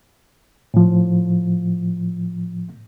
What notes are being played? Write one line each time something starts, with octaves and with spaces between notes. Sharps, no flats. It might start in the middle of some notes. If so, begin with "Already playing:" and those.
A2 F3